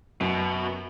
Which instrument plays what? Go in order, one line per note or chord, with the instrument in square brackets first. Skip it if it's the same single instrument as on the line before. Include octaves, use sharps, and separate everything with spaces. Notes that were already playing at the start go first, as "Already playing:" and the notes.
[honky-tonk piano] F#2 [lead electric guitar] B2